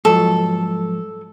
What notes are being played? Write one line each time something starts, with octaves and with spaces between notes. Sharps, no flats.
G#2 F3 F#3 A4